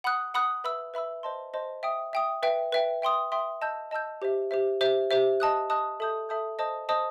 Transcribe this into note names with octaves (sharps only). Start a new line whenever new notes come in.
F#5 B5 D#6 F#6
F#5 B5 D#6 F#6
B4 E5 B5 E6
B4 E5 B5 E6
C5 D#5 A5 C6
C5 D#5 A5 C6
E5 G5 D#6
E5 G5 D#6
B4 E5 G5
B4 E5 G5
E5 G5 C6 D#6
E5 G5 C6 D#6
D#5 A5 E6 G6
D#5 A5 E6 G6
G4 C5 E5
G4 C5 E5
G4 C5 E5
G4 C5 E5
D#5 A5 D#6 F#6
D#5 A5 D#6 F#6
A4 E5 A5 D#6 G6
A4 E5 A5 D#6 G6
C5 D#5 A5 D#6
C5 D#5 A5 D#6